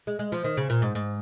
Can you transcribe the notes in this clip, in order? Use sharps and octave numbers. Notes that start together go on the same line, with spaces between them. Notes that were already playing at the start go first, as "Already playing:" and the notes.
G#3
G#3
F3
D#3
C#3
A#2
G#2
G#2